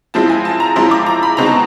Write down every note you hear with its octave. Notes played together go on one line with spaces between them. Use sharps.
F3 G#3 C4 E4 A5
G#5
A5
A#5
F3 G#3 C4 E4 C6
D6
A#5
B5
B2 G#3 C4 D#4 A#5
A5